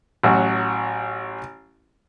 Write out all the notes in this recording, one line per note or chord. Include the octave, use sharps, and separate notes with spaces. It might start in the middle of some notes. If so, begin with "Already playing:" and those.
A1 F#3 F#4